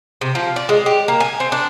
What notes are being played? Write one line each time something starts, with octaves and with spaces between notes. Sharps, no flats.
C3
F3
D5
G#3
G4
A#3
G#5
C4
D4